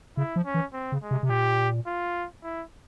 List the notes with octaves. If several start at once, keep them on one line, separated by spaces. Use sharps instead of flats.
C#3 E4
F3
C#4
E3
C4
C#3
G#3
C3
C3
A#2 G4
F4
E4